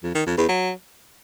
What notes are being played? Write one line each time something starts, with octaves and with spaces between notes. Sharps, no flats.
F2
D#3
F2
E2
F#3